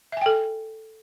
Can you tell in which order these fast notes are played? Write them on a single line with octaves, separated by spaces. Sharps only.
E5 G#5 G5 A4